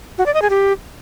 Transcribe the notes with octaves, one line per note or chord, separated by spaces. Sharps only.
F#4
D5
D#5
G#4
G4